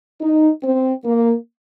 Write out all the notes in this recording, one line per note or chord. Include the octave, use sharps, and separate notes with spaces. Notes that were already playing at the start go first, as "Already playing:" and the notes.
D#4
C4
A#3